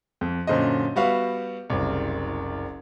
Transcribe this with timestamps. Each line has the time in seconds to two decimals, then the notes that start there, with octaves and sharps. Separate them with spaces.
0.21 F2
0.47 F#2 A#2 D3 C5 D#5
0.96 G3 B3 F#4 E5 F5
1.70 F#1 C2